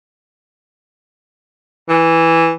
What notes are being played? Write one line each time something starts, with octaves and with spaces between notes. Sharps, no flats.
E3